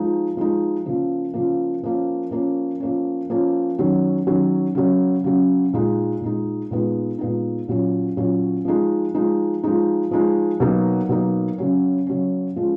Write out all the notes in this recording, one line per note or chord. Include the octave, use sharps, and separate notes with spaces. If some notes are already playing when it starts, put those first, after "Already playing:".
Already playing: F3 G#3 D#4
F3 G#3 D#4
C#3 F3 A#3
C#3 F3 A#3
F3 A#3 C#4
F3 A#3 C#4
F3 A#3 C#4
F3 A#3 C#4
D#3 F#3 C#4
D#3 F#3 C#4
C#3 F#3 C#4
C#3 F#3 C#4
A#2 G#3 D#4
A#2 G#3 D#4
A#2 G#3 B3 D#4
A#2 G#3 B3 D#4
A#2 F#3 C#4
A#2 F#3 C#4
F3 G#3 D#4
F3 G#3 D#4
F3 G#3 D#4
F3 G#3 D#4
B2 F#3 A#3 D#4
B2 F#3 A#3 D#4
C#3 F#3 C#4
C#3 F#3 C#4
F3 G#3 C#4